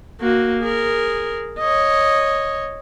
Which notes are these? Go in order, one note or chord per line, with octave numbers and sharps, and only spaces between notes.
A#3 F#4
G#4 A#4
C#5 D#5